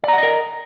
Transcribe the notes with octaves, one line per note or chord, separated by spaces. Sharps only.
A#4 D5 D#5 F#5 A#5